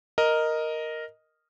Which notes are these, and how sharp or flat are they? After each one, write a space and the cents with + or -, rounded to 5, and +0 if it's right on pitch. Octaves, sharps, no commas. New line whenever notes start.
A#4 +0 D#5 +0